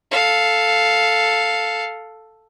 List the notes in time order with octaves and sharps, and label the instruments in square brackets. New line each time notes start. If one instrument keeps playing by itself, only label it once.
[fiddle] A4 F5